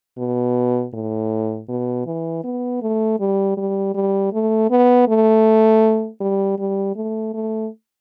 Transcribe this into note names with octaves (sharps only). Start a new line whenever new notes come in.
B2
A2
B2
E3
B3
A3
G3
G3
G3
A3
B3
A3
G3
G3
A3
A3